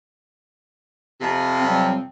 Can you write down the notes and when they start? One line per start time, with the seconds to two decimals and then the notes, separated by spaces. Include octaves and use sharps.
1.21 F2 C3
1.61 F#3 G3 C4